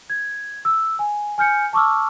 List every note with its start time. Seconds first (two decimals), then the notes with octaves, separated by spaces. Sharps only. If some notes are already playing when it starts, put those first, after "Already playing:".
0.10 G#6
0.65 E6
0.99 G#5
1.38 G#5 F6 G6 C#7
1.73 A5 C#6 D6 E6 F6